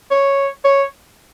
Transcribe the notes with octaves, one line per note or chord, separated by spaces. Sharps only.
C#5
C#5